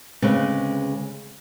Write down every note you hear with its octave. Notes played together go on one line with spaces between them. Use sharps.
D2 C#3 G#3 C4 B4